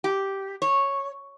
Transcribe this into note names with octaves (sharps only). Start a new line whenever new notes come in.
G4
C#5